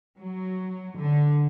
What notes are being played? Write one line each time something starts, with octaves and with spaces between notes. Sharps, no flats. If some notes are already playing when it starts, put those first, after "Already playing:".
F#3
D3